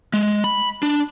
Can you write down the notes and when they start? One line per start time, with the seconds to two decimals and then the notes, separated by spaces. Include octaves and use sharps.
0.13 G#3
0.44 B5
0.83 D4